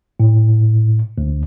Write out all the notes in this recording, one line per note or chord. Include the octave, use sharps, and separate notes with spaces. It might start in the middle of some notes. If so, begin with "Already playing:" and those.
A2
D2